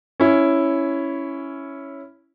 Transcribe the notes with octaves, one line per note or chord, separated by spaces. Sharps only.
C#4 E4